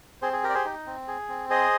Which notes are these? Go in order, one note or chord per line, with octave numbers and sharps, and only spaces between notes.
C4 G#4 C5
G#4
G4 A#4
D5
G#4 C5
D#4
C4
G#4
C4
G#4 C5 D#5